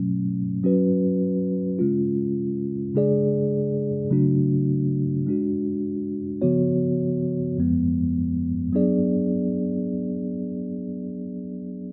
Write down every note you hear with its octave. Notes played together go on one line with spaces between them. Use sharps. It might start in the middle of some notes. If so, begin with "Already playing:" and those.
Already playing: B2 F#3 A3 C#4
F#3 C#4 F#4 B4
C#3 G#3 C#4 F4
C#3 G#3 D4 G#4 D5
C#3 F#3 A3 D4 F#4
G#3 D4 F#4
C#3 F3 B3 F#4 C#5
F2 F3 G#3 B3
F#3 B3 D4 G#4 D5